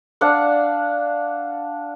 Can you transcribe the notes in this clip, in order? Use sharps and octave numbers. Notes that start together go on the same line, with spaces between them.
D4 D5 F5 F#5